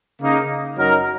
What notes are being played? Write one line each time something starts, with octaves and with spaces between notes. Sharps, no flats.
C#3 A#3 D#4
F#2 F#3 D#4 A#4